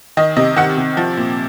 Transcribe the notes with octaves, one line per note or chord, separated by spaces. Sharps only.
D#3 D#5
C3 D#5
D#3 F#5
C3
F3
A#2